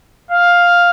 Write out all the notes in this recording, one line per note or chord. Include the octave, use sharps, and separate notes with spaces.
F5